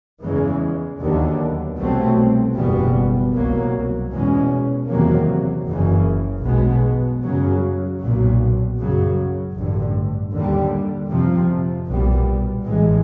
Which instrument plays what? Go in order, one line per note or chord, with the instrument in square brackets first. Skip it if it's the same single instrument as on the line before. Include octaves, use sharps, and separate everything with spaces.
[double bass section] E2 C#3 E3 G#3
D#2 D3 F#3 B3
C2 B2 F#3 A3 C4
F#1 E2 B2 G3 B3
C2 B2 F#3 A#3
E2 B2 G#3 C#4
E2 C3 D#3 F#3 A#3
F#1 F#2 C#3 E3
B1 B2 G#3 B3
F#2 C#3 F#3
B1 A#2 F#3
F#2 C#3 F#3
A1 G2 D3
D#2 D3 G3
F2 C3 F3
B1 A#2 G3 B3
A1 A2 E3 G#3